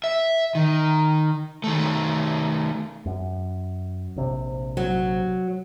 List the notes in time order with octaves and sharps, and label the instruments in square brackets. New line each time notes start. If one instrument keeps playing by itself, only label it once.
[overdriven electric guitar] E5
D#3
D#3 A3
[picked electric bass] F#2
A#1 C3
[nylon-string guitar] F#3